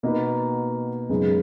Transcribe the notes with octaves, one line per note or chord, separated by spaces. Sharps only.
B2 A#3 D#4 F#4 B4
F#2 C#3 G#3 B3 D#4